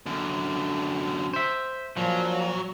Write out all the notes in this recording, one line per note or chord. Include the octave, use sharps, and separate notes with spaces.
F#2 D3
C5 E5
A#2 F3 F#3